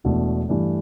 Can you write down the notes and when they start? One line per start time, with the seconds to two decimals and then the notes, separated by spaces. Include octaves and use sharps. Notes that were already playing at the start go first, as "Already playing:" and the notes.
0.04 E1 E2 B2 A3 D4
0.49 G2 E3 A3 D4